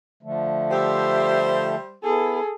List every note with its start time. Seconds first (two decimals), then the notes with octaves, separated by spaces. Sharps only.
0.23 D3 F3 A3
0.71 G3 G4 C5 E5
2.04 B3 E4 G#4 A4